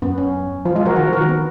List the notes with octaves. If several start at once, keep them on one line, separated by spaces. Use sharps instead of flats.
F#2 B3
C#4
F3 F4
G#3 F4 G#4
F3 F#4 A#4
D#3 F#4 A#4
F3
D#3 F#4 A#4
B3